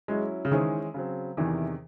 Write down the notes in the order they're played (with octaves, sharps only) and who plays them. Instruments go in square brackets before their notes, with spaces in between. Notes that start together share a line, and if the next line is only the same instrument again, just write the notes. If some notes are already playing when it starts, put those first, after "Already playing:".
[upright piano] F#3 C#4 E4 [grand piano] G#3
[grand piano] C#3
[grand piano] D#3 [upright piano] E3 G#3 C#4 G#4 C5
[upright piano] C#3 F#3 C4
[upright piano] E2 C3 D#3 [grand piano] E3